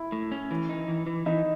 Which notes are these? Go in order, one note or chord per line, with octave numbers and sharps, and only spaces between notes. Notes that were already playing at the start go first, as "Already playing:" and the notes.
Already playing: E4
A2
C#4
E3
D#4
E3
E3
E3 D#4